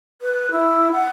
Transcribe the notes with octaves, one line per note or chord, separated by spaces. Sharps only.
B4
E4
F#5